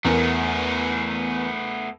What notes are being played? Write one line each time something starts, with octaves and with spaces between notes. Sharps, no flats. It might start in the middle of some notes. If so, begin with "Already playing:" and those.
E2 A3 B3 A#4